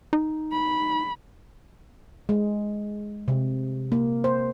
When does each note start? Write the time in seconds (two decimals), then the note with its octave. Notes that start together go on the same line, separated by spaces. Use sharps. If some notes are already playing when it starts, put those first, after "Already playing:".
0.13 D#4
0.52 B5
2.29 G#3
3.28 C3
3.92 A#3
4.24 C5